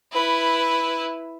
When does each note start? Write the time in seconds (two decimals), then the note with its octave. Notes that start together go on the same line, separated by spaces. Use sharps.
0.12 E4 B4